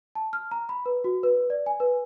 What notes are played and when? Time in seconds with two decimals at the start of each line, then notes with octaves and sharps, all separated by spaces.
0.15 A5
0.33 F6
0.51 A#5
0.69 B5
0.86 B4
1.04 F#4
1.23 B4
1.50 D5
1.66 G#5
1.80 B4